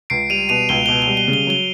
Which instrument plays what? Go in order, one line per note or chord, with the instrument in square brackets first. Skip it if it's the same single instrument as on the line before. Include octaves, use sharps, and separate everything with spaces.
[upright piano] C#2 [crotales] C7 D7
[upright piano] G3 [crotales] D#7 F7
[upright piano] B2 [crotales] D#7 F7
[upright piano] C#2 [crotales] G7
[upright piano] B2 [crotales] G7
[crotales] G7
[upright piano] G3
[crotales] G7
[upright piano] C#3
[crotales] G7
[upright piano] F#3 [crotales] G7